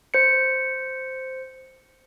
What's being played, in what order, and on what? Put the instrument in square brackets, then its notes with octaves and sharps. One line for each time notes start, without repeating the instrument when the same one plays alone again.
[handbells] C5 C#7